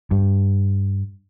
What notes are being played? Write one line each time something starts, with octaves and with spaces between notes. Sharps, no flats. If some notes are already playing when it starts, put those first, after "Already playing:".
G2